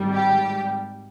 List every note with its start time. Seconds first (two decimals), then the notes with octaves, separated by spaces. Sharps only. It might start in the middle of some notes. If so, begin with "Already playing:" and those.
Already playing: G#1 G#2 G3
0.12 G4